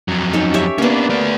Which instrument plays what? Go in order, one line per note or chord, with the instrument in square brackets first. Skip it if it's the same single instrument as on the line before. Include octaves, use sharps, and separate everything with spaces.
[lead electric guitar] F2 F#3
[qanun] C#4 D#4 A4
G4 C#5 E5
[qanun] A#3 B3 [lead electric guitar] C#4 D4
[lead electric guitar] A3 D5